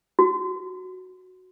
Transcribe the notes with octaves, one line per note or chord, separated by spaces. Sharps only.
F#4